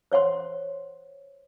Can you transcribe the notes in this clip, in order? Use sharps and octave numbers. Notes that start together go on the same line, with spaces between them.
C5 C#5 F#5 C6